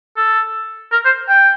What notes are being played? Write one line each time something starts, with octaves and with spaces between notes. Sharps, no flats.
A4
A#4
C5
G5